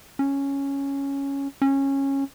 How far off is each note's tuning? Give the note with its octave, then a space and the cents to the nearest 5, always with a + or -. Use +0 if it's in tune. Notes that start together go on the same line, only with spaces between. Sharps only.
C#4 +0
C#4 -15